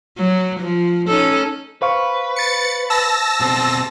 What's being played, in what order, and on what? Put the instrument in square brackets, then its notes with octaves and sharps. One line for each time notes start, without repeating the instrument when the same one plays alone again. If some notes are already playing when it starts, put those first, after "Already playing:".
[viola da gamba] F#3
F3
C#4 D#4 A4
[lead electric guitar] B4 [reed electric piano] C5 F5 C#6
[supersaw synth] A6 C#7
A5 E6 A#6
[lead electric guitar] B2 C4